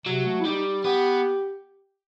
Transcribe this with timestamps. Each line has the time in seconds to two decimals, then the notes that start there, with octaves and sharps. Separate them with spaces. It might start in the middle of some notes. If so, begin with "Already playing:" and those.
0.06 C3 F#3
0.26 A3
0.41 E4
0.45 G3 D#4
0.84 B3 G4